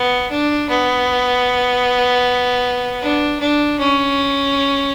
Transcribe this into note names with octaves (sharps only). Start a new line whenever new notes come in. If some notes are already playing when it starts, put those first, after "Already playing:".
Already playing: B3
D4
B3
D4
D4
C#4